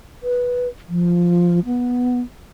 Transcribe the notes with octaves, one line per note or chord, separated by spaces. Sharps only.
B4
F3
B3